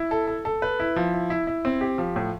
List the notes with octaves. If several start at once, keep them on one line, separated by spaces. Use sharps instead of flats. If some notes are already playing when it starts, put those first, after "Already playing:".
Already playing: E4
A4
A4
A4
B4
E4
F3
E4
E4
E4
C4
G4
F3
A2